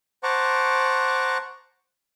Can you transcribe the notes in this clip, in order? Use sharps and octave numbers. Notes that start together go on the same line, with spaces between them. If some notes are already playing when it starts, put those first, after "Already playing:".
C5 F#5 A5 A#5 C#6 D6